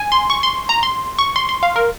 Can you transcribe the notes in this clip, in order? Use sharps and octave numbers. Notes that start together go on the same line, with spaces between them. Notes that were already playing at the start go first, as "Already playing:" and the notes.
Already playing: G#5
C6
C#6
C6
A#5
C6
C#6
C6
C6
F5
A#4